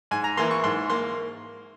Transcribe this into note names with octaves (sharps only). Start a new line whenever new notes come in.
G#2 G#5
A#5
E3 A#3 C6
C#6
G#2 C6
A#3 C6